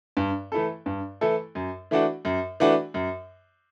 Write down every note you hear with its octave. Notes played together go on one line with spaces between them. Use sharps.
G2
E3 A3 E4 A4
G2
E3 A3 E4 A4
F#2
E3 A3 D4 F#4
F#2
E3 A3 D4 F#4
F#2